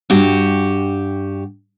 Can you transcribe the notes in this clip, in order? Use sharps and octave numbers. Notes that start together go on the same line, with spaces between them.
G2 F#4 G4